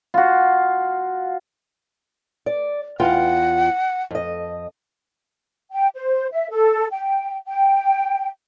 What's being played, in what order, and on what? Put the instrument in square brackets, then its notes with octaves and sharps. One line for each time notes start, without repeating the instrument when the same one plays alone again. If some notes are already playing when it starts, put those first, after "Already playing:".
[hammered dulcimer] F4 F#4
[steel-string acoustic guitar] D5
[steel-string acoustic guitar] E2 F4 G5 [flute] F#5
[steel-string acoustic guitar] F2 D#5
[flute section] G5
C5
E5
A4
G5
G5